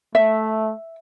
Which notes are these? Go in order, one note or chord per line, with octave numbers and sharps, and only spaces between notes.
A3 E5